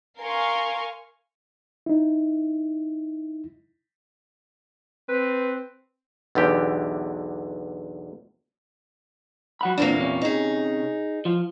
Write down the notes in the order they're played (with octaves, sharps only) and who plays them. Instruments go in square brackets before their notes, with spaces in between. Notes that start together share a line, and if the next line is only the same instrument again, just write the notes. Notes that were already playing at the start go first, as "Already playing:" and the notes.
[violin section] A#4 F5 G#5 C6 C#6
[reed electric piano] D#4 E4
[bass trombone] C4 [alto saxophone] B4
[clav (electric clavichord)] B1 E2 D3 G4
[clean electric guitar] F#3 F#5 B5
[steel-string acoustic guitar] E2 A#2 A#3 [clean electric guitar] C4 D4
[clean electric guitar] C3 C#4
[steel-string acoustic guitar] D#4 G#4
[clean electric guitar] F3 F4